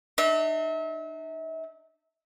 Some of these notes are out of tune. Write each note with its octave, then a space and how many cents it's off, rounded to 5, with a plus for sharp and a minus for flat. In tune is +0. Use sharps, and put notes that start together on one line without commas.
D#4 -45 E5 -35